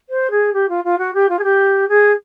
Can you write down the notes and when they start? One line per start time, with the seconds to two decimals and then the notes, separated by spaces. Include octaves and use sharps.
0.09 C5
0.30 G#4
0.53 G4
0.69 F4
0.84 F4
0.98 F#4
1.14 G4
1.29 F4
1.39 G#4
1.44 G4
1.88 G#4